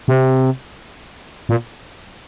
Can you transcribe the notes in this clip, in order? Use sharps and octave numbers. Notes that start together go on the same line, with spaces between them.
C3
A#2